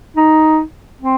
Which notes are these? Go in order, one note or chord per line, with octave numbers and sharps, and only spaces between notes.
D#4
C4